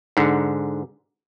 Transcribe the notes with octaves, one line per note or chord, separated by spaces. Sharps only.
G#2 D3